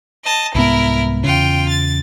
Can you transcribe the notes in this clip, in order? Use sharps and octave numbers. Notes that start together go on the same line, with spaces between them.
D#5 A5
C2 G#2 B3 E4 A#4
E2 C#3 F4 G5
A6